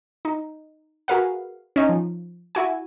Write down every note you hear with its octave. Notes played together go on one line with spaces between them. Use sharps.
D#4
F#4 G#4 A#4 B4 F5 F#5
C#4 D#4
F3
E4 F#4 G#5